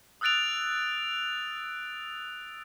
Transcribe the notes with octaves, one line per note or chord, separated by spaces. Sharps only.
D#6 E6 F#6 A6 D7 F7